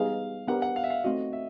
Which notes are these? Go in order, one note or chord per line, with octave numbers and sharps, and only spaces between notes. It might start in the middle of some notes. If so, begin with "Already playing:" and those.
Already playing: G3 B3 D#4 G#4 F5
B3 D4 G4 A#4 F#5
F#5
F5
E5
F5
A3 C4 D#4 F#4 D#5
E5